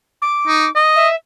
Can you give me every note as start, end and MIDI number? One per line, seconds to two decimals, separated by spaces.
0.22 0.69 86
0.47 0.66 63
0.76 1.08 75
0.96 1.15 76